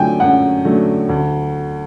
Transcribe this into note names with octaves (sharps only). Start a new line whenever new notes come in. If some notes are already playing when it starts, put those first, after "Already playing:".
Already playing: F#2 D3 F#3 A3 G5 G#5
F#2 F#5
D3 F#3 A3
D2